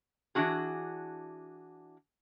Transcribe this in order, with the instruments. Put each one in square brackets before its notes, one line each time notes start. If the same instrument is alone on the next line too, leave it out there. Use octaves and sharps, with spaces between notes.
[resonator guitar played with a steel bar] E3 D4 F#4 G#4